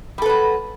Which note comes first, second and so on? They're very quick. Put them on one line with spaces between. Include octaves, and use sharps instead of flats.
G3 A4 B4 F#3